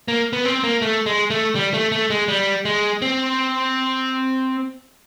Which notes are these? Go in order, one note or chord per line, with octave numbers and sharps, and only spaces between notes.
A#3
B3
C4
A#3
A3
G#3
A3
G3
A3
A3
G#3
G3
G#3
C4